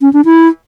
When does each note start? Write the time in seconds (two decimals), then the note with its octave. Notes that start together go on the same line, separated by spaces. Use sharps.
0.01 C#4
0.13 D4
0.25 E4